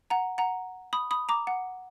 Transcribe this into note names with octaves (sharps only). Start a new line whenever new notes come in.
F#5 A#5
F#5 A#5
B5 D#6
B5 D#6
A#5 D6
F#5